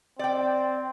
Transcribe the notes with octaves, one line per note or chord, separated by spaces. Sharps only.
C4 D5 G5